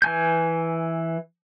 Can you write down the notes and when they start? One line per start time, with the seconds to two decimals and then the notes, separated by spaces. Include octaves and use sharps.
0.02 E3 G#5 G6